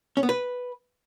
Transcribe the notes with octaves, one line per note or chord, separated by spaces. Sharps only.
C#4
B3
B4